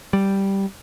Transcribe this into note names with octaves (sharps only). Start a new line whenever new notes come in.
G3